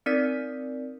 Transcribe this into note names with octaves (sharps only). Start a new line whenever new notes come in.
C4 D#4 A#4 D5 B6